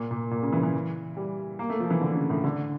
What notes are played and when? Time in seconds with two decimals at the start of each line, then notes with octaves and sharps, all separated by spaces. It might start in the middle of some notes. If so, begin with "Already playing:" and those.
Already playing: A#2
0.11 A#2
0.31 A#2
0.43 C#3
0.53 E3
0.63 E3
1.17 G3
1.59 A#3
1.70 A3
1.80 F3
1.90 E3
2.01 D3
2.15 C#3
2.30 A2
2.44 D3